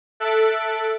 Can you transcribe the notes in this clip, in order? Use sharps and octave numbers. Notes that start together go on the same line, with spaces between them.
A4 E5 F#6 A6 D7